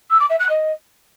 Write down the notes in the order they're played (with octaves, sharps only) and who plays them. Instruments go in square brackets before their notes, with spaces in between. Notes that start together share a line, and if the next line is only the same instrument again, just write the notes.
[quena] E6
D6
E5
F#6
D#5